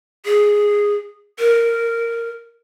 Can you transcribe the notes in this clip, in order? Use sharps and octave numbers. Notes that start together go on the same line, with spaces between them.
G#4
A#4